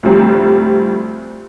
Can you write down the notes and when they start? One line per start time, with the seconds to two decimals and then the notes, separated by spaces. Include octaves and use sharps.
0.03 D2 A2 F3 G3 C4 A#5